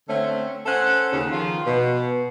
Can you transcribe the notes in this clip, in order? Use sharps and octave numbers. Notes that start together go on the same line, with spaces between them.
D3 A3 C4 C#4
C#4 A4 C5 F#5
D#2 C#3
D#3 F3 F4
B2